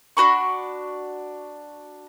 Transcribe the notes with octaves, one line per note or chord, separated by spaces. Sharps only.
D4 F#4 B5 C#6